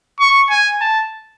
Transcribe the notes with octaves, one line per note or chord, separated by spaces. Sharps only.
C#6
G#5
A5